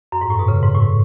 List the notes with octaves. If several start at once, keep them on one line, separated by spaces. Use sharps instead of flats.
F#2
G#2
A2
B2
C#3
G#2
A2